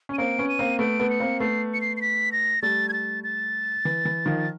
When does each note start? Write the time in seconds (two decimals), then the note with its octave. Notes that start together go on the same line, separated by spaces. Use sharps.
0.09 C#4
0.14 D#7
0.18 A#3 C4 D7
0.38 B3 C#4
0.49 D#7
0.59 A#3 C4
0.79 A3 B3 D7
1.00 A3 B3
1.10 C#7
1.20 A#3 C4
1.40 A3 B3 C7
1.74 C#7
1.81 C7
1.97 C7
2.02 B6
2.32 A#6
2.62 G3 A3 A6
2.89 G#6
2.93 A6
3.24 A6
3.85 E3
4.05 E3
4.26 D#3 F3